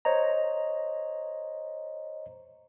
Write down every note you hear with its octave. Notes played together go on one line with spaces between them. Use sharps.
C5 C#5 D#5 A#5